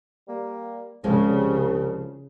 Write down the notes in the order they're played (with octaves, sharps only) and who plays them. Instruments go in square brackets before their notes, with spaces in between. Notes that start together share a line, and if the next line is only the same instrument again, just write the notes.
[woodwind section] G3 A#3
[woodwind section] C2 [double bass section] C#3 [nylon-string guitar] F3 G#3 C4